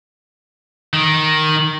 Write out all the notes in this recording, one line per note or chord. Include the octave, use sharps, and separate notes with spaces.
D#3